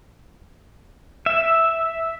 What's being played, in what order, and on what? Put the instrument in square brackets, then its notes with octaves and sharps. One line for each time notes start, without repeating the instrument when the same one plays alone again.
[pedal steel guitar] E5